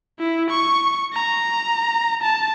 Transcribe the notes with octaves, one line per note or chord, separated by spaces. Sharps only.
E4
C#6
A#5
A5